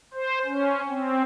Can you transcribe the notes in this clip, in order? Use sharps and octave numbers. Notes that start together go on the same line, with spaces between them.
C5
C#4
C4